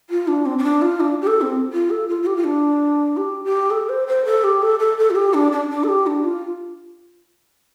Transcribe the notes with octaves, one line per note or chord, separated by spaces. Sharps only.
F4
D4
C4
C4
D4
F4
D4
G4
A4
C4
F4
A4
F4
F4
G4
F4
D4
G4
G4
A4
C5
C5
A4
G4
A4
A4
A4
F4
G4
D4
D4
D4
A4
G4
D4
F4